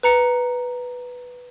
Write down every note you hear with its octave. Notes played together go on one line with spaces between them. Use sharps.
B4 A#5 C#7